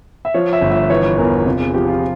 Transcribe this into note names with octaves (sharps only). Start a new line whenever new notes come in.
E5
F3 C#5
E5
G1
E5
E3 C#5
E2 A#4
C3 F4
G#4
F3 G4
F4